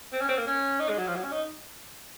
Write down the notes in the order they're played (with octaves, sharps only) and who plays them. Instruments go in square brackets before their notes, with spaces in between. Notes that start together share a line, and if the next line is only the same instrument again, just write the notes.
[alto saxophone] C4
C#4
C4
A#3
C#4
D#4
G#3
F#3
F3
F#3
C#4
D#4